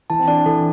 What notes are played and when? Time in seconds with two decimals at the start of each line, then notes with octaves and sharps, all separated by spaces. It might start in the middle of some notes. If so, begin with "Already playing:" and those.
0.10 E3 A5
0.19 C4
0.28 D4 D5
0.46 E3 A4